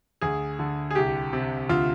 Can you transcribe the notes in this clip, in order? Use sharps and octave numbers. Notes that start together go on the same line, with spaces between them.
D2 G#4
D3
G#4
C2 G4
C3
D2 F4